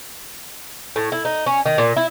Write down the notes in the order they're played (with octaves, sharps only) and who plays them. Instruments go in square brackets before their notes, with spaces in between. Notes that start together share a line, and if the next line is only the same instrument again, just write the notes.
[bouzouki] A2
E4
D#4
C#4
D#3
A#2
E4